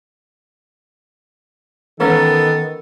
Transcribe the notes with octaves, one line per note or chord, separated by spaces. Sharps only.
D#3 E3 G#3 B3 C#4 A4